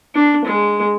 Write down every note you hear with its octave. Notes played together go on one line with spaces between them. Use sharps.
D4
G#3